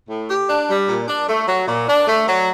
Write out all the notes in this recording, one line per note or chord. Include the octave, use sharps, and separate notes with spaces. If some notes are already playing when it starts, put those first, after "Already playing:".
A2
G4
D4
G3
A#2
D4
A3
F#3
A#2
D4
A3
F#3